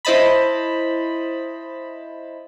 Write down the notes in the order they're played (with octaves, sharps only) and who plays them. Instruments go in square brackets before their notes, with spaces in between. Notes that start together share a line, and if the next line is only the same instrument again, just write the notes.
[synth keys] E4 C5 D#5 A5 B5